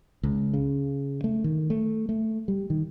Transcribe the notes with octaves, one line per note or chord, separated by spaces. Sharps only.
C#2
C#3
A3
D#3
A3
A3
G3
D#3